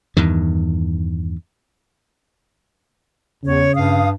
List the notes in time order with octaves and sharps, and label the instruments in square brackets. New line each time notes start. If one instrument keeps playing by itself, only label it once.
[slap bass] E2 G2 D#3
[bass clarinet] E2 [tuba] C#3 [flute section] C#5
[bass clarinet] G2 [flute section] F5 D#6